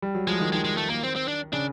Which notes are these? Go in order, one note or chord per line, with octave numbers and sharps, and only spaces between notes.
G3
F#3
F3 G#3
D#3
D#3 G#3
G#3
A3
A#3
C4
C4
D4
C#3 D4